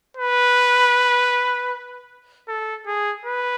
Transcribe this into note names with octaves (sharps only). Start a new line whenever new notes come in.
B4
A4
G#4
B4